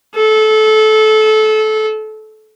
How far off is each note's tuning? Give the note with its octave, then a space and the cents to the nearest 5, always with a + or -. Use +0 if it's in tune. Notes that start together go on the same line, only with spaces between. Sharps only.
A4 -25